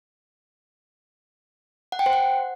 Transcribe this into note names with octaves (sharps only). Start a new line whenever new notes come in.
F#5
G5
C5
F#5